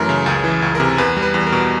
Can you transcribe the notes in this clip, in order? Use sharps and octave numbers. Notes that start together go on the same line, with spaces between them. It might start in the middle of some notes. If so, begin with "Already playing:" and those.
Already playing: F#2 E3 A3 A#4
C#3
C#2 G#4
E3
C#2
C3 A#4
E2 B4
G3
B4
E2
A#4
B2